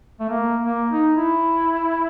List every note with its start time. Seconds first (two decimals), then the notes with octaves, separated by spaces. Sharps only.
0.20 A3
0.29 A#3
0.65 A#3
0.90 D#4
1.15 E4